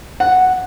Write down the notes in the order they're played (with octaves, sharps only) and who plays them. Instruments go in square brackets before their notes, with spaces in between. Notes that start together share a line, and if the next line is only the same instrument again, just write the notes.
[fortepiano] F#5